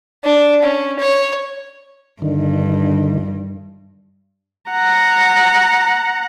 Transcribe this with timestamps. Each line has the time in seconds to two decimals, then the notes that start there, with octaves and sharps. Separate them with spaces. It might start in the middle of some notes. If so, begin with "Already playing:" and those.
0.25 D4
0.63 C#4
0.99 C#5
2.22 G2 D3 D#3
4.71 F#5 A#5